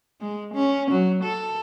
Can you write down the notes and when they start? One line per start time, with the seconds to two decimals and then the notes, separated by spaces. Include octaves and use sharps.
0.20 G#3
0.54 C#4
0.91 F#3
1.23 A4